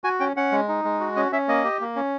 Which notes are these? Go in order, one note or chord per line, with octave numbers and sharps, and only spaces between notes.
F#4 G#5
C#4 G5
C#4 F#5
G#3
D#4
G#3
F#4
C#4 D#5
C#4 E5
A#3 D#5
G4
A#3
C#4